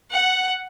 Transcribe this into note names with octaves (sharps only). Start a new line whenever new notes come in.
F#5